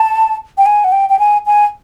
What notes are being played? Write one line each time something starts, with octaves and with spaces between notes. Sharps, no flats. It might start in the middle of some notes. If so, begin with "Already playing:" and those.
Already playing: A5
G5
G#5
F#5
G5
G5
G#5
G#5